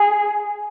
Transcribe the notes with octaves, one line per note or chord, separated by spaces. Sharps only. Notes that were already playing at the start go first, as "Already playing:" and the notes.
Already playing: G#4